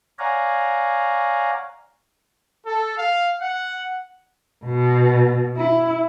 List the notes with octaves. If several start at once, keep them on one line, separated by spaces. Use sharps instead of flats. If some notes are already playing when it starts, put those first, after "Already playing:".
C#5 D5 F5 F#5 G#5 A#5
A4
F5
F#5
B2
E4